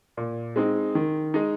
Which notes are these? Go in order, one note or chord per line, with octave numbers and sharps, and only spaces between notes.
A#2
G#3 C4 D#4
D#3
G#3 D#4